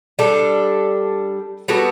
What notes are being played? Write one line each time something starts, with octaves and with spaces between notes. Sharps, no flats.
G3 D4 A4
G3 B3 F#4 A4